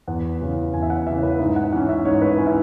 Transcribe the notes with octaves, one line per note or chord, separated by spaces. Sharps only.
E2 F#5
C#3 E3
E2 G#5
E5
F#5
C#3 E3 E5
B4
G#2 E5
F#5
E3 C#4 F#5
E5
G#2 C#5
B4
E3 C#4 G#5
E5